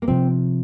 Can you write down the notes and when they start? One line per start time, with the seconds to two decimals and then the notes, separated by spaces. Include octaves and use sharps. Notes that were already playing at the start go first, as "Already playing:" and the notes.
0.02 A#3
0.08 C3 F3 C4